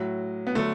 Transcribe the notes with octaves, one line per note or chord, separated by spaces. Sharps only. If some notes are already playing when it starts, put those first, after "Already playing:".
Already playing: A2 F#3
B3
D3 F#3 A3